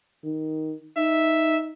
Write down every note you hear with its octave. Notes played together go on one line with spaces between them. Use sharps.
D#3
D#4 E5